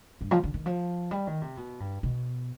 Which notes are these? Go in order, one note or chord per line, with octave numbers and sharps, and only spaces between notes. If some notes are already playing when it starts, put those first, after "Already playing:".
G2
F3
D3
D#3
F3
G3
D#3
C3
B2
G2
B2